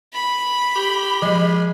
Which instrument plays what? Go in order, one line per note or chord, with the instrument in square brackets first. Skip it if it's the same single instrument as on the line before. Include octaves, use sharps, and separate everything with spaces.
[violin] B5
[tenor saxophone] G4
[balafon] F3 D#5 [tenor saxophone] G#3